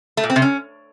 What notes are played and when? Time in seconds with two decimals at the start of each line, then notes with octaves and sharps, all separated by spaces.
0.17 A3
0.24 A#2
0.30 C4
0.36 C3
0.42 C#4